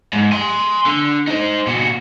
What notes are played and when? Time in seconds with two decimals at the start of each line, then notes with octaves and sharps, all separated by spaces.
0.13 G#2
0.32 G#5 C6
0.86 D3
1.28 D#4 C5
1.67 A#2 F#4